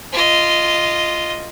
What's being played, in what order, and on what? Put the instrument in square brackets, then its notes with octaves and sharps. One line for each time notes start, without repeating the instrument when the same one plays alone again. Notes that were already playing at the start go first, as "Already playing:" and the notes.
[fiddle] F4 D#5